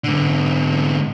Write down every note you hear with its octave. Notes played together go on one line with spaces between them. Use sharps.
G#2 D3